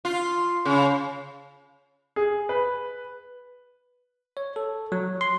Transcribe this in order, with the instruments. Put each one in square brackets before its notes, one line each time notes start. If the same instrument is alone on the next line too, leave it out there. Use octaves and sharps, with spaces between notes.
[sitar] F4
C#3
[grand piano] G#4
B4
[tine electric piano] C#5
A4
F#3
C6